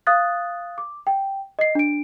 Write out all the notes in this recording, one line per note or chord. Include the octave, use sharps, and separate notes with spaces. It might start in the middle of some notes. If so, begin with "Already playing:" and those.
F5 D#6 F#6 A6
D6
G5
D#5 C7
D4 D7